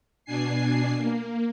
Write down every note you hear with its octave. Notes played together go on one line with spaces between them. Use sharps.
B2 D4 G#5 C7
A#3